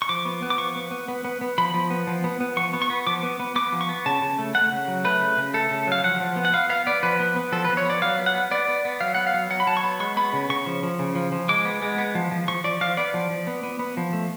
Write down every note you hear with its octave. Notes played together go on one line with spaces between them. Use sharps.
C#6
F3 D6
B3
B3
D6
F3 C#6
B3
B3
B3
B3
B3
F3 B5
F3
B3
F3
B3
B3
F3 C#6
B3
C#6
B3
F3 D6
B3
B3
B3 D6
F3
C#6
B3
C#3 A5
C#3
A3
A3 F#5
C#3
F#3
A3 B4
C#3
C#3
A3 A4
C#3
F#3 F5
F3 F#5
F3
B3
F#5
B3 F5
B3 F5
B3 D5
F3 B4
B3
B3
F3 A4
B4
F3
C#5
B3 D5
F#3 F5
B3
F#5
B3
B3 D5
B3
B3
F#3 F5
B3 F#5
F5
F#3
F#3 F#5
B5
F#3 A5
C#6
B3 B5
G#3 C#6
B3 B5
C#3
C#3 C#6
F3
F3
C#3
F3
F3
G#3 D6
B3
G#3
B3
F3
F3
F3 C#6
F3 D5
F3 F5
B3 D5
F3
F3
B3
B3
B3
F3
A3